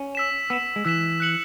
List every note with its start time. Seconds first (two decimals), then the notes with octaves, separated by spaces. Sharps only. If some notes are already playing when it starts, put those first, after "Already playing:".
Already playing: C#4
0.15 E6 B6 E7
0.50 B3 E6 B6 E7
0.76 G#3
0.85 E3 E6 B6 E7
1.20 F#6 C#7 F#7